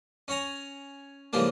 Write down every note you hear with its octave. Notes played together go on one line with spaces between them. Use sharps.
C#4 C#5 G#5 A#5
G#2 C#3 E3 F3 G3 A#3